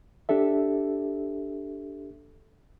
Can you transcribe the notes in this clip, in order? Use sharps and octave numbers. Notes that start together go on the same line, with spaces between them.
D4 G4 A4 E5